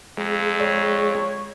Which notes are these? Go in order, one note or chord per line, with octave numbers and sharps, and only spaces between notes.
F2 G#3
G#4 C#5 D5